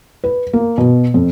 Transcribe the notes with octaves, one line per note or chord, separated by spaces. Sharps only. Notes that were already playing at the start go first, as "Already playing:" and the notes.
B4
A#3
B2
F2